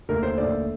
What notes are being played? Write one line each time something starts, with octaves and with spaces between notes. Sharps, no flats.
D#2 D3 A3 A#4
C5
D#2 D3 A3 D5